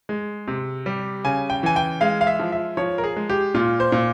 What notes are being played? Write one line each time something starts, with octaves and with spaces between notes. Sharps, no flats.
G#3
C3
G3
C#3 G#5
G5
E3 G#5
G5
G#3 F5
F5
E5
F3
E5
F3 C#5
A#4
G#4
G#3
G4
A#2 F4
C5
A#2